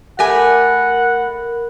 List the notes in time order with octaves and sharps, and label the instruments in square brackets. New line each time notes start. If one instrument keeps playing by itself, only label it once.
[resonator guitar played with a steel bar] A3 G4 G#5 [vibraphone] A#4 B5 [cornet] F#5